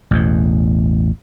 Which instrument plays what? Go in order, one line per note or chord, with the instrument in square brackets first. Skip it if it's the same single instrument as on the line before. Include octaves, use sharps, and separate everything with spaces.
[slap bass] A1 E2 B2